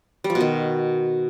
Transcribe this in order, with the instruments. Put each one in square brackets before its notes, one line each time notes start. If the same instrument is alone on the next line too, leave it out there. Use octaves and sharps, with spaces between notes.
[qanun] G3
F3
B2
D#3